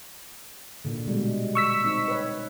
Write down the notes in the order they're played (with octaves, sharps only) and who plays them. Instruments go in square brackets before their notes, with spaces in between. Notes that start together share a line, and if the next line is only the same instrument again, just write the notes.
[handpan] A#2 D3
B2 G3 G#3
[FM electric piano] C#6 E6 B6
[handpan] C4 D#4
B4 C#5